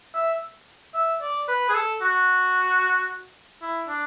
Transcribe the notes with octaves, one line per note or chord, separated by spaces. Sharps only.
E5
E5
D5
B4
G#4
A4
F#4
E4
D4